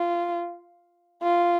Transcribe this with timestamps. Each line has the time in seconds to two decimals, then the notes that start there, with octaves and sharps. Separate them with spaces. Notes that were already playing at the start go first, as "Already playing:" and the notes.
Already playing: F4
1.23 F4